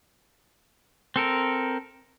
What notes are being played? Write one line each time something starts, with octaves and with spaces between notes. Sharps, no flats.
C4 A4 A#4